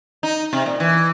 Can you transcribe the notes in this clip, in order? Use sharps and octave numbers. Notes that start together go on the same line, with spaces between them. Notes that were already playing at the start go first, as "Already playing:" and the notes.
D#4
C3
A#2
E3